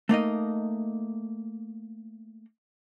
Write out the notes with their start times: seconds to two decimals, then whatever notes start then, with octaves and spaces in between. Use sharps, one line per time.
0.09 A3 A#3 D#4 D#5